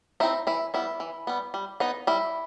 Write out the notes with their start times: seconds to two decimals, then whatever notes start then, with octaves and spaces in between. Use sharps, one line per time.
0.20 C4 D#4 E4
0.47 E3 E4
0.74 G3 B3 E4
1.00 E3
1.27 G3 B3
1.54 G3
1.80 B3 D#4
2.07 G3 E4